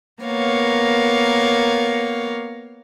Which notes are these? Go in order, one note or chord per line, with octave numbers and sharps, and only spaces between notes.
A#3 B3 A#4 C#5 F5